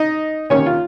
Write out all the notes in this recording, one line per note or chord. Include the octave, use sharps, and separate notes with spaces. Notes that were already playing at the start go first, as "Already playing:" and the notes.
Already playing: D#4 D#5
C3 D#3 A#3 C#4 C#5
F4